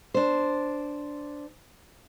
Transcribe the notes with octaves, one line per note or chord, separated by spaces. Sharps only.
D4 C5